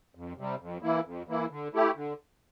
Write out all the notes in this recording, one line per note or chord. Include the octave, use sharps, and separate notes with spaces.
F2
C3 G3
F2
E3 A#3 E4
F2
E3 A#3 E4
D3
A3 E4 G4
D3